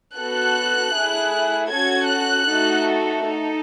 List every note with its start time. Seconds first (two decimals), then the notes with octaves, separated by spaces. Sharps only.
0.17 B3 F#4 A4 F#6
0.94 A3 E4 G#4
1.70 C#4 F#4 A4 G#6
2.09 F#6
2.47 A3 D#4 F#4 A4
3.25 D#4 A4